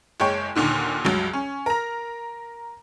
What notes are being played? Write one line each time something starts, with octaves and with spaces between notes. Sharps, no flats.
F#1 G#3 C#5 G5
D#2 A#2 D3 D#3
C#2 G2 F#3
C#4
A#4 A#5